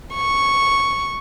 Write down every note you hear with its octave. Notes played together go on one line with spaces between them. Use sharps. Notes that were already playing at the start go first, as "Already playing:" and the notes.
C#6